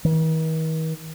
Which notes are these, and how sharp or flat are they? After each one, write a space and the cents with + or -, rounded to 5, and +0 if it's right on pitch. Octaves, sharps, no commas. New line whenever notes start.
D#3 +45